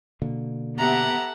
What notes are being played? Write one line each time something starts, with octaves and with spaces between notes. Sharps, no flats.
B2 D3 A#3
B3 G4 A4 E5 F#5 A#5